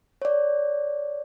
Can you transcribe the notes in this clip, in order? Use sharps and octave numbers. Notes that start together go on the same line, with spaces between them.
C#5 D5